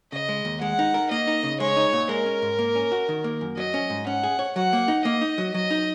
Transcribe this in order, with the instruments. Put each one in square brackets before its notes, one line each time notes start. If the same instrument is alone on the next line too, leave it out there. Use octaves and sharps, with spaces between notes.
[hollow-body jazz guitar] C#3 [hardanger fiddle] D#5
[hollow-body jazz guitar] G#3
D#2
[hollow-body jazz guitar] G#3 [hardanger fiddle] F#5
[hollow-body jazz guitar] D#4
A#4
[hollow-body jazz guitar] A#3 [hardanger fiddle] D#5
[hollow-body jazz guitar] D#4
C#3
[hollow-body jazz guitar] G#3 [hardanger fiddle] C#5
[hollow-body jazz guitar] D#4
A#2
[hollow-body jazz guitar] G#3 [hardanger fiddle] A#4
[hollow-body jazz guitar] C#4
G#2
A#3
C#4
F#4
D#3
A#3
F#2
[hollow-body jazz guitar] F#3 [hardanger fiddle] D#5
[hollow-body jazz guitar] C#4
G#2
[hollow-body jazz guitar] C#4 [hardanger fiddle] F#5
[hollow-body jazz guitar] G#4
C#5
[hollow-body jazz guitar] F#3 [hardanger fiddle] F#5
[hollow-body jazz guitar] A#3
D#4
[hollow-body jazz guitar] A#3 [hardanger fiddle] D#5
[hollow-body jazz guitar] D#4
F#3
[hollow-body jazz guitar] F#3 [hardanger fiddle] D#5
[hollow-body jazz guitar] D#4